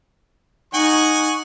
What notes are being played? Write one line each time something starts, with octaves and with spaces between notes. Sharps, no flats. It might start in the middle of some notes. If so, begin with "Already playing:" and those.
D#4 F#5 G#5 C#6